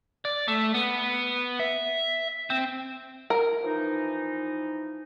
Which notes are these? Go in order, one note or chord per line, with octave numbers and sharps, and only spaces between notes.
D5
A3
B3
E5
C4
A#4
E3 F3 D#4